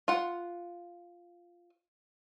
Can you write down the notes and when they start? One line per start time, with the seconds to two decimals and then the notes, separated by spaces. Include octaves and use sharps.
0.08 F4 F#5